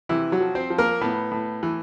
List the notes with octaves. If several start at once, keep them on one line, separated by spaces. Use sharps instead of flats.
C3 E3 E4
F#3 F#4
F3
C4 C5
F3
A#3 A#4
A2 B3 B4
A2
E3